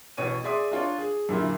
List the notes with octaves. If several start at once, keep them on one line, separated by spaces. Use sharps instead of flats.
A1 B2 C#5 D#7
G#4 D5 E5 C6 D6 D#6
D4 F4 C#5
G#4
F#2 A#2 D3 E4